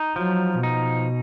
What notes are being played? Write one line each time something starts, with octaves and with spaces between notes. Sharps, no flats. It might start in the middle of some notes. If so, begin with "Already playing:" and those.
Already playing: D#4
F3 F#3
B2 D#4